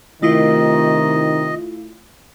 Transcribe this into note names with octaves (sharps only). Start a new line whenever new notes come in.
C3 D#3 A3 E4 F4 D#5